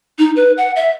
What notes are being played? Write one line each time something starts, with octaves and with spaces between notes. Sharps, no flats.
D#4
B4
F#5
E5